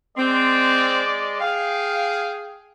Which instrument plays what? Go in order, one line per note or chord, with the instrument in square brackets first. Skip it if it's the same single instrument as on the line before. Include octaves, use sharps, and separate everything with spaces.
[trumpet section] G#3 D5 [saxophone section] C4
[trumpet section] G#4 G5 [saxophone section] F5